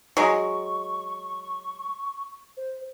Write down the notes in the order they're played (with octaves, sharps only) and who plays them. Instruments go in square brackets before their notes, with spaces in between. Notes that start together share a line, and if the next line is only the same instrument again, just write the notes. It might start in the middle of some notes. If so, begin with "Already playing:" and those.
[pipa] F#3 G#3 [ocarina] C#6
[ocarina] C5